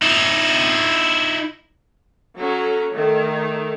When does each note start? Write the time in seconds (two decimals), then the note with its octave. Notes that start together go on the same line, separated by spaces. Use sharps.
0.02 D#4 E4
2.36 F#3 C#4 A4 A#5
2.92 D#3 A3